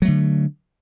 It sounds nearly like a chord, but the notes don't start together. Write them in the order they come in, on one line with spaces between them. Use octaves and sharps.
F#3 A3 D3